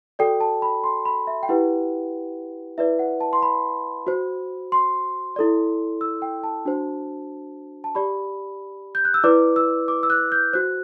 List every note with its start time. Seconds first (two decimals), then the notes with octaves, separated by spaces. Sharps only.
0.19 F#4 A4 D5 G5
0.41 A5
0.62 B5
0.84 C6
1.05 B5
1.27 E5
1.43 G5
1.49 E4 G4 B4 F#5
2.78 E4 B4 D5 E5
2.99 F#5
3.21 A5
3.33 C6
3.42 B5
4.07 F#4 C5
4.72 C6
5.36 E4 A4 D5
6.01 E6
6.22 G5
6.43 A5
6.65 D4 F#4 C5
7.84 A5
7.95 G4 D5 B5
8.95 G6
9.05 F#6
9.14 E6
9.24 E4 B4 D5 D6
9.56 E6
9.88 D6
10.03 E6
10.10 F#6
10.32 G6
10.53 F#4 C5 F#6